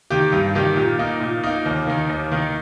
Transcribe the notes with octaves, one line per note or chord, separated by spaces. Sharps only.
D#3 A#3 G4
G2
D#3 A#3 G4
A#2
A#3 D#4
A#2
A#3 D#4
D#2
D#3 A#3 D#4
D#2
D#3 A#3 D#4